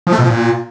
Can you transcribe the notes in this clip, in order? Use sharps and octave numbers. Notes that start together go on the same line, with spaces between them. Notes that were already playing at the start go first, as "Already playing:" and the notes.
F3
A3
B2
F3
A#2